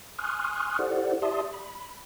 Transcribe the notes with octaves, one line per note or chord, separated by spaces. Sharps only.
G#5 C6 C#6 D#6 F6 F#6
E4 G4 A4 C5 D5 F#5
G4 D5 E5 A5 C6 D#6
B5